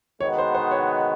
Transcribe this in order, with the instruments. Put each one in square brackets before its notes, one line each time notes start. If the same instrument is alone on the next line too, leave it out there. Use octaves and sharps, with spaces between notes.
[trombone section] D#3 G#3 B3 D#4 F#4 [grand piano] C#5
[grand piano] C5
C5
C#5